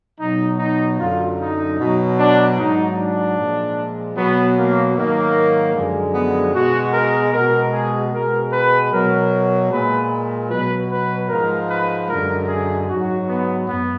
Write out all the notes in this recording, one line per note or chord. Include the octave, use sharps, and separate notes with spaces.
B2 F#3 D#4
D#4
F#2 D3 F#3 F4
D#4
B2 F#3
D4
G#2 F#3 D#4
D4
A#2 F3 G#3
B2 F#3 B3
A#3
G#2 D#3 F#3 A#3
F#2 D3 F3 G#3
B3
B2 G#3 F#4
A#4
B2 G#3 A#4
G#4
B2 G#3 A#4
B4
B2 F#3 A#4
A#2 G#3 B4
B2 F#3 B4
B4
G#2 F3 G#3 A#4
B4
F#2 D3 G#3 A#4
G#4
G#2 F#3 F#4
B3
F#2 B3